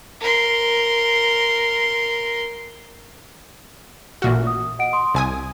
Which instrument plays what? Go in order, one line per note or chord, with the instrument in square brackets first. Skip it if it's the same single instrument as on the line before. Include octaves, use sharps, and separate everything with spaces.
[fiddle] A#4 C6
[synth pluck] A1 A#2 F#4 [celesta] E5 F6
[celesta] D#6
D#5 F#5 D7
C6 D#6
[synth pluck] C2 G#5 D#6 [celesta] C6